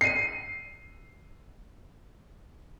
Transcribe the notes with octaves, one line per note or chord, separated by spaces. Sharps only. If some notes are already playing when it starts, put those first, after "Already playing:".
C7 D#7